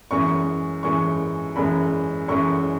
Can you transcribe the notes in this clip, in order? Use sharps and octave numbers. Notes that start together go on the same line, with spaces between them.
F#2 E3 G#3 C#6
F#2 E3 G#3 C#6
F#2 E3 G#3 B5
F#2 E3 G#3 C#6